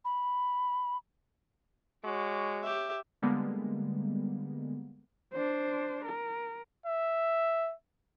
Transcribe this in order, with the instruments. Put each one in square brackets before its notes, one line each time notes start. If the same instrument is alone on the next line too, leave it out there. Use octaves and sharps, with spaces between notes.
[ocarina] B5
[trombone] G#3 [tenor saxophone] F#4 [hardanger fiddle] C#5 D6
[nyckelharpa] G4 E5
[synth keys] D3 G3 G#3 A#3 B3
[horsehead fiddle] D4 C5
A#4
[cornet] E5